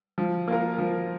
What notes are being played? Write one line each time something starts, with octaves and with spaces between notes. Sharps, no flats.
F3
A#3 F4 A#4
F3